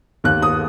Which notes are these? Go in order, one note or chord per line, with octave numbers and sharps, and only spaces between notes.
D#2 F#6
D#6